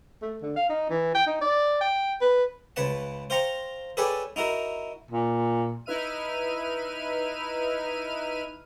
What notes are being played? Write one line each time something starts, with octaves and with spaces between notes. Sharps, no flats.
A3
D3
F5
D#4
E3
G5
D#4
D5
G5
B4
C#2 B4 C#5 F#5 A5
C5 F5 G5 A#5 C#6
G#4 A4 B4 C#5 D5 G5
D#4 E4 F#4 A#4
A#2
D#4 E4 B4 E5 F6 D#7